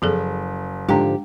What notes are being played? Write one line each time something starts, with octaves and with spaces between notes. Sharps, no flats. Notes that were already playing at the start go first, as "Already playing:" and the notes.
F#1 F3 G#4 A4
G#2 D3 F3 G#3 D4 G4